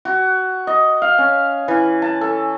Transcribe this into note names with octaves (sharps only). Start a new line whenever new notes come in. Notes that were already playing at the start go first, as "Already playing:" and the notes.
F#4
D#5
F5
C#4
E3
A5
A4